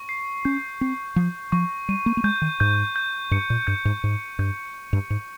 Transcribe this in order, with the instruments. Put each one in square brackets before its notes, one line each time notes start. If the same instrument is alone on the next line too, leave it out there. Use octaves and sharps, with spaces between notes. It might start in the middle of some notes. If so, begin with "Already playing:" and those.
Already playing: [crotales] C#6
C7
[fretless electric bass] C#4 [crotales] G6
[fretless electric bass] C4 [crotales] C7
[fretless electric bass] F3 [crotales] C7
[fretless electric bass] F3 [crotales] C#6
[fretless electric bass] G3 [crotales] D#7
[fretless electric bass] A#3
A#3
[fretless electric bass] G#3 [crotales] G6
[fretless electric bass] D#3
[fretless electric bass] G#2 [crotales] G6
[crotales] G6
[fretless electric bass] G2 [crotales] C#7
[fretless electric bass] A#2
[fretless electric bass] G2 [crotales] G6
[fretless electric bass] G#2
[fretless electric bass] G#2 [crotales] G6
[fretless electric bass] G2 [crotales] G6
[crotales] G6
[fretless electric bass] G2
[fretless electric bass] G#2 [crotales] C#7